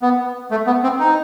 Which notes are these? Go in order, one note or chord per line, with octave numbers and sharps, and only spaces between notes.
B3
A3
B3
C4
D#4